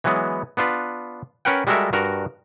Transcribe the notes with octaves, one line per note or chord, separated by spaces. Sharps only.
E3 F#3 G#3 B3
B3 D4 F4 B4
C#4 A#4 B4 F#5 G5
G3 G#3 F#4 A4 A#4 E5
G2 F#4 A#4 A#5